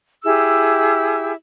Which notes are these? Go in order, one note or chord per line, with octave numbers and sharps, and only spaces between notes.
E4 G4 G#4 E6